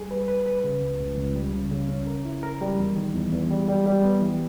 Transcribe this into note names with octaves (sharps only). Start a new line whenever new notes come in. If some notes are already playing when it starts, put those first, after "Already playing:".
Already playing: G3 G#4
B4
B4
B4
C#3
C#2
C#2
C#2
G3
C#3
C#3
C#4
A#4
E4
A#4
G3
E2
D#3
E2
E2
G3
G3
G3
B3
E3